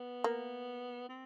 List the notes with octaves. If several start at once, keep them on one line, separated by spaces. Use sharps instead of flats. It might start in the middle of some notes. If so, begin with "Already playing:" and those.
Already playing: B3
A#3
C4